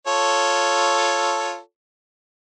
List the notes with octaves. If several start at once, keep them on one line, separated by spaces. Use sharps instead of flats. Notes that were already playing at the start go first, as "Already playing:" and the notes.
F4 A4 C#5